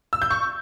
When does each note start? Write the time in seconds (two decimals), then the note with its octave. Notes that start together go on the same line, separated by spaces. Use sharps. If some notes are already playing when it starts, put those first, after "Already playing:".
0.13 E6
0.22 G6
0.30 C#6